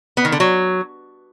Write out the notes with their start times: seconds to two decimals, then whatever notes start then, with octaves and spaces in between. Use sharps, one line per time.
0.17 B3
0.25 D#3
0.32 D3
0.40 F#3